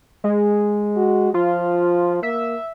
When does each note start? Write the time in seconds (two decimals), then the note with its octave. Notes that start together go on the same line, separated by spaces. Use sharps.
0.24 G#3
0.97 F#4
1.34 F3 F4
2.23 A#3 E5